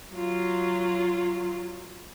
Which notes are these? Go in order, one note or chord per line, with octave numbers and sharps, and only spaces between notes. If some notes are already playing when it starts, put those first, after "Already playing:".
F#3 F4